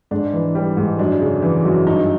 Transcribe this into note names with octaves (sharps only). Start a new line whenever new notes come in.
G#2 D4
E3
G3
G#2
F#2 D4
C#3
E3
F#2
G2 D#4